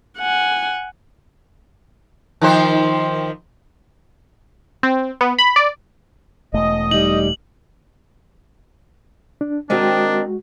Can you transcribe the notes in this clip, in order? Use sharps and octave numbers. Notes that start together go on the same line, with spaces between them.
F#5 G#5
D#3 F3 C5
C4
B3
B5
D5
E1 A3 D#5
G3 D#4 F#7
D4
D#3 G#3 C4 D4 D#4 F#4